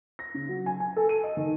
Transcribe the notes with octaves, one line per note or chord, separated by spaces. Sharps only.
A#6
C#3
F#3
G#5
G#5
A4
D#7
D#5
D#3